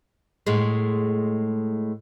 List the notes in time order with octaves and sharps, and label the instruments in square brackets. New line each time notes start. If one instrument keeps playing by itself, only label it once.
[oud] A2 G#3